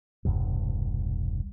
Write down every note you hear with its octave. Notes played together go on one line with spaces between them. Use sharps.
E1 C2 G2